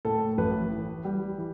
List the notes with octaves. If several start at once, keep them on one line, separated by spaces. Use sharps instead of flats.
A2 A4
A1 B4
E3
G3
E3